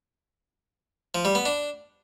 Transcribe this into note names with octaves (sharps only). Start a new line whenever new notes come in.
F3
G3
B3
D4